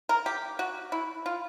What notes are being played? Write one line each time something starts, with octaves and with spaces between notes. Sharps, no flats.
A#4
G4
F#4
E4
F4